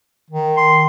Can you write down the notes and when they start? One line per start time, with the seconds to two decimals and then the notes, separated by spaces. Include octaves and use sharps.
0.31 D#3
0.57 C6